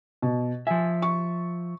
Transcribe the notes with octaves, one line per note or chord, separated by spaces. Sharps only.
B2
F3 E5 G#5
C#6